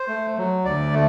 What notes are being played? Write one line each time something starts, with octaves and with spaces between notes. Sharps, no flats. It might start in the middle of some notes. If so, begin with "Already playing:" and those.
Already playing: C5
A3
F#3
D2 D5
A3